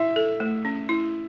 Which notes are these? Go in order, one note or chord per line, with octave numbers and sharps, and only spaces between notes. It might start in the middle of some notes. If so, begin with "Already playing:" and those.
Already playing: E4 E5
A4
A3
C#4
E4